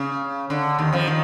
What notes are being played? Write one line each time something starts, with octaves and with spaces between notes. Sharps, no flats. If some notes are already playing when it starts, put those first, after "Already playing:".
Already playing: C#3
D3
D#2 D#3
F2 F3
D#3